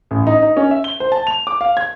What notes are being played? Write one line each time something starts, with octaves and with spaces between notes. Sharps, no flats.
A1
D#4
D#4
C#4
E5
G7
C5
A5
F7
D6
F5
G#6